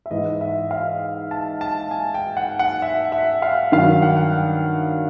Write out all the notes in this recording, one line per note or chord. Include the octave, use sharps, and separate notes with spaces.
E5
G#2 E3 D#5
E5
F5
A5
A5
G#5
G5
F#5
F#5
E5
E5
F5
G2 D#3 F#3 F5
F#5
G5
F#5
G5